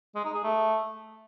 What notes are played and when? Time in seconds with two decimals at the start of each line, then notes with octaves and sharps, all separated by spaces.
0.15 G#3
0.25 D#4
0.34 G#4
0.44 A3